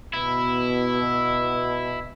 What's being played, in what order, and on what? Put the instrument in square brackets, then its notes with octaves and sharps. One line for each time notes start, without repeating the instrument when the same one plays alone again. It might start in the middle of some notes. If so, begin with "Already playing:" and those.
[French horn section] B2 [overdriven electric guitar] E4